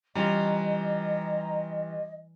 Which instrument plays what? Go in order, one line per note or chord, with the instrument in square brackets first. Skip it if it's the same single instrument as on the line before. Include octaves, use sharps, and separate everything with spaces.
[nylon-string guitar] E3 [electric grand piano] G3 C#4 F4 [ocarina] D#5 [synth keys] A#5